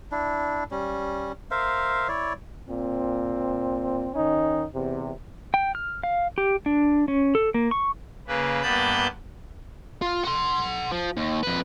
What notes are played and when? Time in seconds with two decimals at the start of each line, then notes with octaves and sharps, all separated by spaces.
0.12 D4 E4
0.71 G3 C#4
1.51 A#4 C5 E5 F5
2.09 E4 C#5 D5
2.68 A#2 C4
4.14 D#3 C#4 D#4
4.74 E2 C3
5.54 G5
5.75 F6
6.03 F5
6.38 G4
6.66 D4
7.08 C#4
7.35 A4
7.54 A#3
7.71 C#6
8.27 C#3 A#3 B4
8.63 G2 A#3 B3 A5 B5 G6
10.02 F4
10.24 F#5 C6
10.92 F3
11.17 D#2
11.43 F2 B4